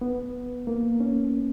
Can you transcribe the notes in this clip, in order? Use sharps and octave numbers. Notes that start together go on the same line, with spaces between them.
B3
A#3
C#4